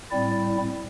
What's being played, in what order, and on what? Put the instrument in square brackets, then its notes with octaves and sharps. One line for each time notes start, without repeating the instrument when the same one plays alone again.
[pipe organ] A2 G3 C4 E4 D5